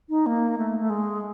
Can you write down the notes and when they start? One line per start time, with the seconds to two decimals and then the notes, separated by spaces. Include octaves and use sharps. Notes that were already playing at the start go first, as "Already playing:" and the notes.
0.09 D#4
0.26 A#3
0.58 A3
0.80 A3
0.90 G#3